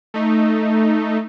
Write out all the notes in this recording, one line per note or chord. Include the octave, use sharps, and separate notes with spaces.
A3 D#4